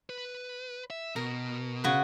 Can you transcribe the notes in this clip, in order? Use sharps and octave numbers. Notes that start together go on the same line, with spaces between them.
B4
E5
B2 A#4
C#3 F#4 B4